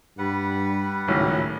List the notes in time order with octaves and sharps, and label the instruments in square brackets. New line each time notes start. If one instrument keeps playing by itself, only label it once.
[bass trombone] G2 [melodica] G3 B4 F#5
[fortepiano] G#1 A2 F#3 [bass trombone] C#2